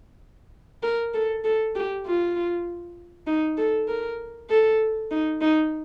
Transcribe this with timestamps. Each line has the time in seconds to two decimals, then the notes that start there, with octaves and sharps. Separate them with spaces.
0.83 A#4
1.14 A4
1.44 A4
1.75 G4
2.06 F4
3.27 D#4
3.57 A4
3.88 A#4
4.50 A4
5.11 D#4
5.41 D#4